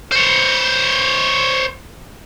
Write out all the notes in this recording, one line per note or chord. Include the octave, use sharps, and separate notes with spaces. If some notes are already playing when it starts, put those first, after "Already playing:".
C5 C#5